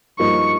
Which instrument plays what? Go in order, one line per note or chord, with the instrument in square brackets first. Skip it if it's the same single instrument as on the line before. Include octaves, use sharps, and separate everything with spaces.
[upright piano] G2 F3 A#3 D#4 [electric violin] C#6